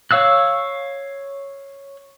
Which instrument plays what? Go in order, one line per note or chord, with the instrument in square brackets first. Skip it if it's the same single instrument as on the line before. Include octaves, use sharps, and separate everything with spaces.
[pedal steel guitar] C#5 F5 E6 F#6